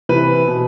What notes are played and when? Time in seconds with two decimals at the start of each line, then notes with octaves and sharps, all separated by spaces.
0.09 C3 E3 B4
0.48 B2